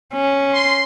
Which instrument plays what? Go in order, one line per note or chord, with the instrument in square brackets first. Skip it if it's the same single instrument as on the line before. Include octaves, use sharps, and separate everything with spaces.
[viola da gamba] C#4
[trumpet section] C6